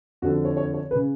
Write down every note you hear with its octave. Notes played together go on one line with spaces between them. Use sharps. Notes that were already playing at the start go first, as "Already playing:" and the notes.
F2 D3 F#4
C#5
C#5
C#5
B4
C#3